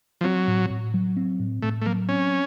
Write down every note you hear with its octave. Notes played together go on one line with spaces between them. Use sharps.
F3
F#3 C4
A2
A2
F#3
C4
A2
A2 A3
A3
F#3 A#3
C4 C#4